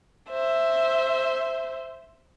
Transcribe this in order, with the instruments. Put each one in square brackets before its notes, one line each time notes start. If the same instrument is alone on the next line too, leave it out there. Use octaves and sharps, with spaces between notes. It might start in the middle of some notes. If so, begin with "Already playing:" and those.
[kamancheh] C5 E5